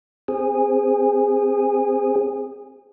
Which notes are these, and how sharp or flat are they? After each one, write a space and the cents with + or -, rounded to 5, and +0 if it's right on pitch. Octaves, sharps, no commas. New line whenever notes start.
C4 +0 G#4 -20